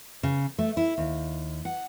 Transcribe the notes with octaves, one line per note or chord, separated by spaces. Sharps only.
C#3
A3
E4
D#2
F#5